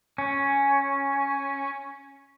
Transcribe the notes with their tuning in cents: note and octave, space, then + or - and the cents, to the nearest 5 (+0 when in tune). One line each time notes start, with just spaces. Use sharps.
C#4 +0